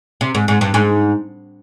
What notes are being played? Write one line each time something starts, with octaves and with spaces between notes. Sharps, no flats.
C3
G#2
G#2
G2
G#2